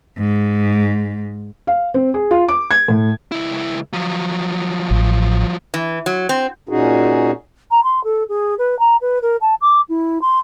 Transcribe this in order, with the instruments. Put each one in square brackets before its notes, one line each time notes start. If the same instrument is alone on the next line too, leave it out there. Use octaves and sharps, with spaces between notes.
[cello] G#2
[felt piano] F5
C4
G#4
F4
D6
G#6
A2
[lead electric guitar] C#2 E4
F3 F#3
[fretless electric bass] A1
[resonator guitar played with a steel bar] E3
F#3
C4
[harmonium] A#2 C#4 D#4 F#4 G#4
[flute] A#5
C6
A4
G#4
B4
A#5
B4
A#4
A5
D6
E4
C6